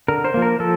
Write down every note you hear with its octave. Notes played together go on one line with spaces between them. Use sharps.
D3 A#4
C5
F3 A#3
A#4
F3 A4